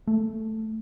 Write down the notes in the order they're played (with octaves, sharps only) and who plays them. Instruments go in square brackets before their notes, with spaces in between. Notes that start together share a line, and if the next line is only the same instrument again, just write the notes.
[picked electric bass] A3